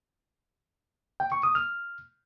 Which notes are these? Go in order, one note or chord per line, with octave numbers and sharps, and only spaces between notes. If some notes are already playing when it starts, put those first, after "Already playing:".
G5
C#6
D#6
F6